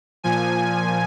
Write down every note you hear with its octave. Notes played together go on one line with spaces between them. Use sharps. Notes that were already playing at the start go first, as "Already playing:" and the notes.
A#2 F3 G#5